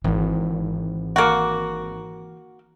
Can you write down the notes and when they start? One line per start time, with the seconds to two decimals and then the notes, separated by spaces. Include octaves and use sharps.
0.04 G#1 D3 E3
1.16 A#3 F#4